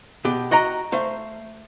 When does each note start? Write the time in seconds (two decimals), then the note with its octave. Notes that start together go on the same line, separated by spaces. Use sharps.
0.25 B2 G4
0.51 F#4 D#5 G5 A#5
0.92 A3 C5 F5